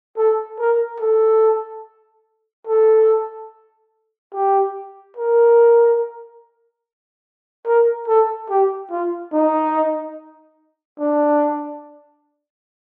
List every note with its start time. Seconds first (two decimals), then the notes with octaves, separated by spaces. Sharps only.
0.17 A4
0.59 A#4
1.00 A4
2.67 A4
4.34 G4
5.17 A#4
7.66 A#4
8.08 A4
8.50 G4
8.91 F4
9.33 D#4
10.99 D4